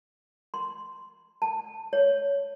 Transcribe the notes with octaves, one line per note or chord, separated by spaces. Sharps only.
C6
A5
C#5